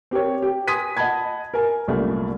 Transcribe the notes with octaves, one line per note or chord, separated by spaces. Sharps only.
C4 G4 A#4 C#5
G4
G#5 C6 D#6 G#6 B6 D#7
D#5 F#5 A5 B5 G#6
A#4 G#5
C2 F#2 A#2 G3 A3 A#3